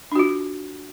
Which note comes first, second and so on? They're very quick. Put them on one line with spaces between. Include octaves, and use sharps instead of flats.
D4 F#4 F4